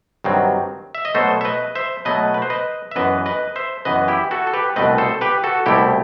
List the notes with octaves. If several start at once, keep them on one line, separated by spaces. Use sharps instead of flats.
G2 D#3 F#3 C4
E5
D#5
B2 F#3 A3 A4 C5
E5
B4 D#5
C5 E5
B2 F#3 A3 B4 D#5
B4
C5
B4 D#5
E5
F#2 E3 B3 B4 D#5
B4 D#5
C5 E5
F#2 E3 B3 B4 D#5
E4 G4
F#4 A4
A4
G4 B4
C2 B2 A3 C4 B4 D#5
A4 C5
G4 B4
F#4 A4
C2 B2 A3 C4 E4 G4